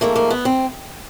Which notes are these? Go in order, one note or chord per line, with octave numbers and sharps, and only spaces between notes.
G#2 F3 A3 A#3
A#3
B3
C4